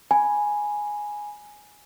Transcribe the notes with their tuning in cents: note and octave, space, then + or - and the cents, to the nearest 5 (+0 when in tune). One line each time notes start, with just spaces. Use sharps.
G#5 +0 B5 -20